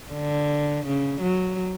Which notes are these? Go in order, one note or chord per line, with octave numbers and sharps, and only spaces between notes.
D3
C#3
F#3